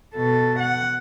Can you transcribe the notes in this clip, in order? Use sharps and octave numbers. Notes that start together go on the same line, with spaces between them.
B2 A4
F#5